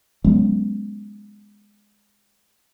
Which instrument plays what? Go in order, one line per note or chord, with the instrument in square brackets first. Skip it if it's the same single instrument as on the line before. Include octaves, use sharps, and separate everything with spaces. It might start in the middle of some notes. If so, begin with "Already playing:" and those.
[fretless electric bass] F#3 G#3 B3 C#4